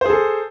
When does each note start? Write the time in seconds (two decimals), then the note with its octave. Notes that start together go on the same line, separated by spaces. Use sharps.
0.01 C5
0.06 G#4
0.10 A4